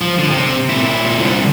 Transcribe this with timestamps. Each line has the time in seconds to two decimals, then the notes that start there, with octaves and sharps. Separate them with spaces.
0.01 F3
0.18 D3
0.31 C3
0.70 A#2 E4
1.17 C2 D3